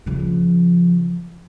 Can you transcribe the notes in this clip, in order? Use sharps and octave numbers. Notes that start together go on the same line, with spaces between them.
C#3 F3